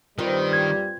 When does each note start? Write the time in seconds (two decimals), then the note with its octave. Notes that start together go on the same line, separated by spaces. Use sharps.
0.19 G2 A#2 D#3 G3 C4 F4 B4
0.53 G#6